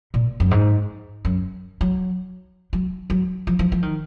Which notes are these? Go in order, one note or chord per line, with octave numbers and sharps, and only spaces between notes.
A#2
F#2
G#2
F#2
F#3
F#3
F#3
F3
F3
F3
D#3